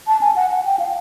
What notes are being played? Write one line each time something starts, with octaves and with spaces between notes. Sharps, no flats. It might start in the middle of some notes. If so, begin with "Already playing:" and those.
A5
G#5
F#5
F#5
G5
F5